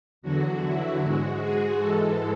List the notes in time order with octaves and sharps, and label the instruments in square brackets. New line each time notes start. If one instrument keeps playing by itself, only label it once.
[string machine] E2 D3 F#3 F#4
E4
G#2 G#3 F#4
G#4
G#2 E3 G#3 A4